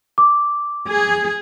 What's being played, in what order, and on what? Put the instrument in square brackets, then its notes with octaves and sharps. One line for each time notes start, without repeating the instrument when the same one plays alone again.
[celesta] D6
[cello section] G#4